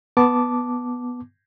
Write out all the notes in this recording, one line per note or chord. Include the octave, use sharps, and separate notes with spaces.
B3 A5 D6